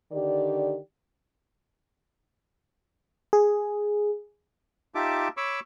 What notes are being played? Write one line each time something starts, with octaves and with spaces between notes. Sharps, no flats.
D3 D#3 G4 D5
G#4
D#4 F4 G4 E5 A5 D6
C#5 B5 C#6 D6 E6